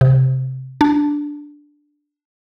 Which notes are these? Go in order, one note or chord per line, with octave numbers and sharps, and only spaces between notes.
C3
D4